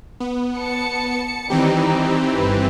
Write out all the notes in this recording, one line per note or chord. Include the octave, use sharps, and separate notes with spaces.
B3
A5 C#7
D#3 E3 G3 C4 D#4 G4
G1 B4